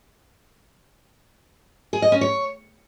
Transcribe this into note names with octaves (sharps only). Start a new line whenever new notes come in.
G#4
D#5
C#4
C#5